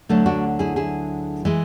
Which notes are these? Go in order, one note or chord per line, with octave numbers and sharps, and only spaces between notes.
D2 D3 F#3 A3
D4 F#4
E4 G#4
E4 G#4
E3 G#3